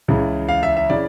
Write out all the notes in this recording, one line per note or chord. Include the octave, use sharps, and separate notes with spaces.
C#2 C#3 E3
F5
E5
E5
C#3 E3 D5